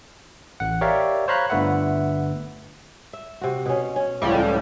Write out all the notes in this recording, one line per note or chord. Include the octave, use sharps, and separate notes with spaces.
A1 F#5
G4 A#4 C#5 D5 E5 F5
C5 C#5 F5 A#5 B5 F#6
G1 D3 A3 B4 E5 F#5
E5
C3 F#4
B2 C#4
C#4
C#2 A2 F3 G3